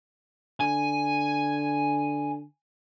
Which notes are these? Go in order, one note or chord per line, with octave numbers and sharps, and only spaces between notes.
D3 G#5